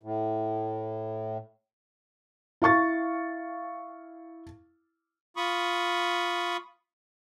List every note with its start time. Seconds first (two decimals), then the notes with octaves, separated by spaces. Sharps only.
0.03 A2
2.62 E4 F5 C#6 A6
5.37 F4 B5 C#6 D#6